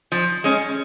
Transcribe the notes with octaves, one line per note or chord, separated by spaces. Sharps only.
F3
G#3 C#4